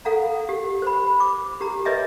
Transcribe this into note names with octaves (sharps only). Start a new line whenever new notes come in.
A4 F5 F#5 A#5
G4
C5 B5
D6
G4 A#5
B4 C#5 D#5 E5 G#5